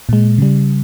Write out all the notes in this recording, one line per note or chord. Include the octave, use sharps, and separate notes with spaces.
A#2 G#3
C#3 G3